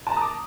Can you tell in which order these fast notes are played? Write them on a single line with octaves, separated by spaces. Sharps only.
A5 A#5 D#6 D6